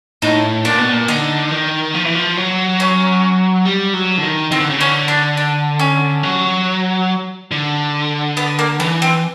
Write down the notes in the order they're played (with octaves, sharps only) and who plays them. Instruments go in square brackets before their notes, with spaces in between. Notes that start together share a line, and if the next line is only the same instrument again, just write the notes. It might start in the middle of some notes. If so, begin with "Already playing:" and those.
[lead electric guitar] A2 [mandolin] D#4
[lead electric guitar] A#2 [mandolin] D4
[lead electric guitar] B2
A#2
[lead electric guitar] D3 [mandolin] D#4
[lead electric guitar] D#3
F3
E3
F3
F#3
[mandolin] C#4
[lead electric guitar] G3
F#3
D3
D#3
[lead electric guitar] D#3 [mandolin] C4
[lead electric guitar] D3
C#3
[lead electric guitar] D3 [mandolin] C#4
[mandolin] D4
D4
C#4
[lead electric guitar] F#3
D3
[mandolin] B3
A#3
[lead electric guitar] E3 [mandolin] B3
[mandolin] C4